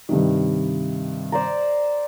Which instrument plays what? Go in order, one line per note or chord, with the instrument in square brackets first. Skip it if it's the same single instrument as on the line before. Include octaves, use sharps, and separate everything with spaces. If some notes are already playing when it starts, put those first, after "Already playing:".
[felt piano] G2 C3 D#3
[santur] C5 D5 A#5